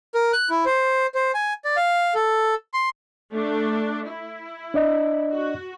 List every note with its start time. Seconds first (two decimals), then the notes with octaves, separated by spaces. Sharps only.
0.15 A#4
0.33 F#6
0.50 E4
0.65 C5
1.15 C5
1.34 G#5
1.65 D5
1.77 F5
2.15 A4
2.74 C6
3.33 A3 D4
4.08 E4
4.74 D4 D5 D#5
5.32 F#4